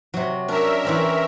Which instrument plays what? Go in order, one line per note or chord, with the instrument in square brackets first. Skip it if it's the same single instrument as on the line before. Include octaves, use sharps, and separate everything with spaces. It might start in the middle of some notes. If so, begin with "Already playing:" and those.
[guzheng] C3 F#3
[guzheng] C#4 D4 [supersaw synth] A#4 E5
[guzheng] E3 C4 C#4